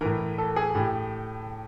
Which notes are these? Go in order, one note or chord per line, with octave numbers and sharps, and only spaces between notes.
A2 E3 A#4
A4
G#4
A2 G4